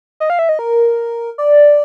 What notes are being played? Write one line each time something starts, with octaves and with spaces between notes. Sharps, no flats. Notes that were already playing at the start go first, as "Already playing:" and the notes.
D#5
F5
E5
D#5
A#4
D5